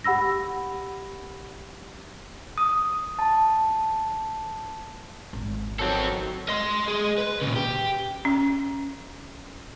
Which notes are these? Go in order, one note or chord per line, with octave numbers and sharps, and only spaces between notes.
G4 F#5 B5 E6 A#6
D#6
A5
G#1
D#3 F#3 C4 A4
D#5 C6
G#4 D#5
B4
A#2 C#3
G4
C#4